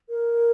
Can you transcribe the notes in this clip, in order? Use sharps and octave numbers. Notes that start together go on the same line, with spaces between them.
A#4